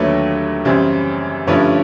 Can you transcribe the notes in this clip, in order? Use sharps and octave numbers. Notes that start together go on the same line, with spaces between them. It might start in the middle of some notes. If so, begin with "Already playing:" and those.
Already playing: D#2 D3 F#3 A3 B4 C#5
F#2 C#3 E3 G3 C4
G2 D3 F3 A3 C#4 B4 C#5